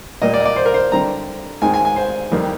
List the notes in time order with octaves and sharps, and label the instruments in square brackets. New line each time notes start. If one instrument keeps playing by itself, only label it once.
[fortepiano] A#2 G3 A#3 D#5
D5
D#5
D5
C5
A#4
C5
D3 G3 C4 A#5
G#2 D#3 G#3 C4 G#5
G#5
G#5
C5
F2 D#3 G3 A#3